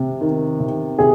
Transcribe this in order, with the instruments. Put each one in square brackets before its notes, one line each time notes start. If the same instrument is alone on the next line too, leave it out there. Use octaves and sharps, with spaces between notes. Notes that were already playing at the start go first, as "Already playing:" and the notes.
Already playing: [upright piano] C3
D#3
C3
C3 G#4